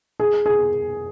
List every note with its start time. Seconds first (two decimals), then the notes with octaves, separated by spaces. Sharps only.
0.20 G#4
0.46 G#4